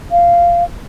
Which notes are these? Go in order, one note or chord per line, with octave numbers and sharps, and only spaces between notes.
F5